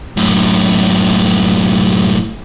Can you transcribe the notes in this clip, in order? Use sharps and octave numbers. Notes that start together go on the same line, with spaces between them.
F#2 A2